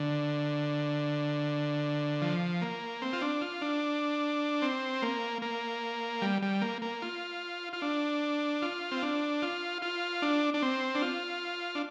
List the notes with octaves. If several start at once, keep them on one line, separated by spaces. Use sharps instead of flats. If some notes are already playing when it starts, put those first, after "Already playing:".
Already playing: D3
F3
A#3
C4
F4
D4
F4
D4
C4
A#3
A#3
G3
G3
A#3
A#3
F4
F4
D4
F4
C4
D4
F4
F4
D4
D4
C4
D4
F4
D4